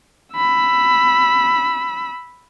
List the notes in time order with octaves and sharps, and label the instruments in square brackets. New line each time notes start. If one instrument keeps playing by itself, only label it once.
[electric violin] B5 E6